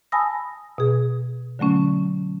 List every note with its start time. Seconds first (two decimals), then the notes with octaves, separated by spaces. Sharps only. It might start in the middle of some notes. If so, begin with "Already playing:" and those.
0.12 G#5 A5 B5 D#6 E6 A#6
0.78 B2 G#4
1.59 D3 F#3 A3 C#4